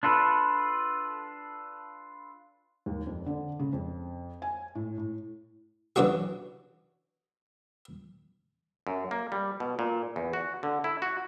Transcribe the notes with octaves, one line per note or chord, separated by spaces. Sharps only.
D4 F4 A4 B4
D#2
F2
D3
C#3
F2
G#5
A2
A2
E3 F#3 D4 F#4 G#4
F#2
A#3
G3
B2
A#2
E2
F#4
D3
E4
F#4